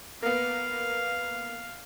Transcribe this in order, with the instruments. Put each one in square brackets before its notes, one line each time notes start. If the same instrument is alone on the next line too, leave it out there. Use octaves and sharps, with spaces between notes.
[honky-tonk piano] A#3 B3 [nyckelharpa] F5